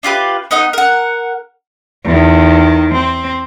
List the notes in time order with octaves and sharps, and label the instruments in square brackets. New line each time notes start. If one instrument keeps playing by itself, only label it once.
[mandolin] D4 F4 G4 B4
B3 D#4 D#5 F#5
A#4 F#5
[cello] E2 D#3
C4